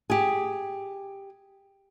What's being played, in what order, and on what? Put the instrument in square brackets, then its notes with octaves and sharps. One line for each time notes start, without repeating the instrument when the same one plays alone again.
[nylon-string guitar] G4 G#4